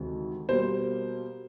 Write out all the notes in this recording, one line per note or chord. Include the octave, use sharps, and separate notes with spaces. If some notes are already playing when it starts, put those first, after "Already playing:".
Already playing: D2 C3 D#3 G#3
B2 G3 A#3 C5